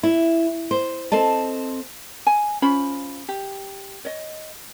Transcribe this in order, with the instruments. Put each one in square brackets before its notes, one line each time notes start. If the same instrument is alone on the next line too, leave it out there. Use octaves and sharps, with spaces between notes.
[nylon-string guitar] E4
C5
C4 A4 D#5 A5
[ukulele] G#5
C#4 F4 C5 B5
G4
C#5 D#5